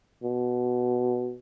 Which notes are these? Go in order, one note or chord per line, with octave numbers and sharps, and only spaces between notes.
B2